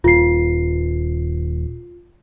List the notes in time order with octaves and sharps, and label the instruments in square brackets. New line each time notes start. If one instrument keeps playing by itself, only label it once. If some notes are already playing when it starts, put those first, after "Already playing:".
[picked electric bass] D#1 [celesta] F4 C7